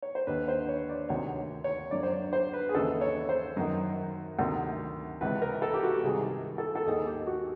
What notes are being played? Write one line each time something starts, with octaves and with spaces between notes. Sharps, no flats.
C#5
C5
D#2 D3 B4
C5
C#5
D5
D2 C3 D#3 C#5
C#5
F#2 D3 D5
C5
C#5
C5
B4
G#4
D#2 C#3 E3 A4
C#5
C5
F#2 D#3
D2 C3 D#3
C#2 C3 E3 B4
A#4
A4
G4
F#4
C2 C3 D#3 G#4
A4
A4
D#2 D#3 G#4
G4
F#4